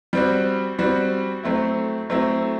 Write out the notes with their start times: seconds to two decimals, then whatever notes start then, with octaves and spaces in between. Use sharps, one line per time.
0.13 G3 C4 F#4
0.79 G3 C4 F#4
1.43 F#3 A3 C4 E4
2.10 F#3 A3 C4 E4